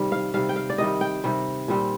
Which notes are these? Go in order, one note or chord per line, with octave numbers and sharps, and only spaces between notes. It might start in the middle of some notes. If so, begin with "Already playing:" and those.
Already playing: C3 D#3 G3
F5
C3 D#3 G3 F5
G5
F5
D5
C3 D#3 G3 D#5
G5
C3 D#3 G3
A#2 G3 C4